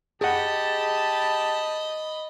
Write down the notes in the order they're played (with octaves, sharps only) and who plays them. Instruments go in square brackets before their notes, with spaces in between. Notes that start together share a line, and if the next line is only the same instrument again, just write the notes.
[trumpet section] G4 A5 [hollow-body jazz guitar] G#4 F#5 [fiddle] D#5 B5